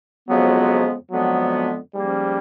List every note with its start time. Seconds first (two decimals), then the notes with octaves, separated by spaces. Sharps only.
0.28 F2 C#3 F3 F#3 G#3 B3
1.11 F2 D3 F3 F#3 G#3 B3
1.95 G#2 F3 G3 A#3 C#4